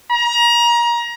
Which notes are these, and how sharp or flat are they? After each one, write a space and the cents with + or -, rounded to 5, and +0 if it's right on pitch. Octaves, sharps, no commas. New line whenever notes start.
A#5 +30